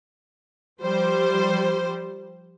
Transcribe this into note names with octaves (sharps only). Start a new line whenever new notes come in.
F3 G3 C5